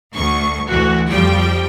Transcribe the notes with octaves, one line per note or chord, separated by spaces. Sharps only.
D2 C#6
D2 E3 F#4
F2 F3 G3 G5